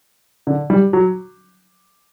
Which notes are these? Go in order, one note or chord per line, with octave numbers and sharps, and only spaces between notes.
D3
G3
F#3